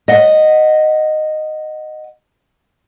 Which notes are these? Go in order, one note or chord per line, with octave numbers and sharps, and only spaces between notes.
D#5 F#5